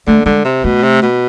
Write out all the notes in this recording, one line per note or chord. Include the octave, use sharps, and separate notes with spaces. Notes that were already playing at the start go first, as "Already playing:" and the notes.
D3 A3
D3 G#3
C3
B2 A3
C3
B2